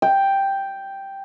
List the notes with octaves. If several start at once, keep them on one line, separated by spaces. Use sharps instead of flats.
G5